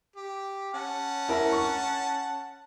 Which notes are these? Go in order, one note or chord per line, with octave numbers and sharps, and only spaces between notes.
G4
C#4 F#5 A5
E4 A#4 E5
C#6